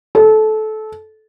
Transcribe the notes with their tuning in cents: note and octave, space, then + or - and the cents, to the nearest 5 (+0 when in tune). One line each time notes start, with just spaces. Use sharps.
A4 -20